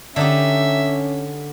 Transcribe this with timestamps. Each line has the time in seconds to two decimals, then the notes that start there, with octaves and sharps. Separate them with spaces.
0.16 D3 C#4 D#4 G4 E5